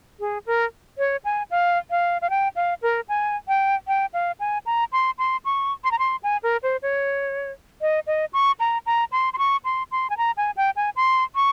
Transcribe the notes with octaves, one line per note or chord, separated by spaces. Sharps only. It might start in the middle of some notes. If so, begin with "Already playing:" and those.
G#4
A#4
C#5
G#5
F5
F5
F5
G5
F5
A#4
G#5
G5
G5
F5
G#5
A#5
C6
C6
C#6
C6
A#5
C6
G#5
A#4
C5
C#5
D#5
D#5
C#6
A#5
A#5
C6
C6
C#6
C6
C6
G#5
A#5
G#5
G5
G#5
C6
C#6